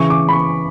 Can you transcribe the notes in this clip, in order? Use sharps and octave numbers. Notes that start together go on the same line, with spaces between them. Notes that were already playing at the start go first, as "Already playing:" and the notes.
Already playing: C#3 E3 C#6
D6
B5
C#6